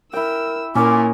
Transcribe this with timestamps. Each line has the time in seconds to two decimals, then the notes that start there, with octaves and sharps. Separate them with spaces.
0.13 E4 A#4 G5 E6
0.75 A#2 C#4 E4 A#4 D#5 D6